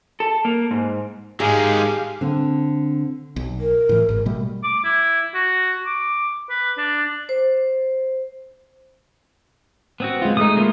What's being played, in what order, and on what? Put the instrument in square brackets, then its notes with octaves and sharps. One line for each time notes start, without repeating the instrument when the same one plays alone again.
[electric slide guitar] A4
A#3
G#2
[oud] G#2 [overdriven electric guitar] D#3 G#3 [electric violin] G4 F5 [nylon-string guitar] G#4
[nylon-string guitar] D3 C4
[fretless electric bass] B1
[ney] A#4
[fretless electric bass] A2 E3
G#1 G#2
B2 G3 A3
[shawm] D6
E4
F#4
D6
B4
D4
[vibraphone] C5
[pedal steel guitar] B3 C4 F#4
[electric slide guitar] G#3 F4
[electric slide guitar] G#3 A3 [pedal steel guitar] D#4 D#6
[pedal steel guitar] A#3 B3 F4